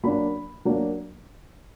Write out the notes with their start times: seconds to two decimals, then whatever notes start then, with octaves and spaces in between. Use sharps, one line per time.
0.03 F#3 A#3 D4 B5
0.65 F#3 A#3 D4